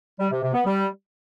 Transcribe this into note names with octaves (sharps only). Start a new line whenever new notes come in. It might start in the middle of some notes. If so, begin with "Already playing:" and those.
G3
C3
C3
B3
G3